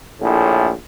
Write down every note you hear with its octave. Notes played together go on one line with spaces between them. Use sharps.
A#1 A2